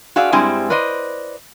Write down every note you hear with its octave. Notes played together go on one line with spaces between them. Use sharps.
F#4 G#4 D5 E5 F5
G2 G3 G#3 C4 E4 G#5
B4 C5 D5 D#5